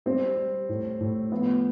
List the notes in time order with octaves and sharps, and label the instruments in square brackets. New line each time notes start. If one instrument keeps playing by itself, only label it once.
[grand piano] G3 [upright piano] C4
[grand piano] G3
A2
A2
[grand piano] F3 [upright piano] B3